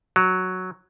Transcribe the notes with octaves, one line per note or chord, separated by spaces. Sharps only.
F#3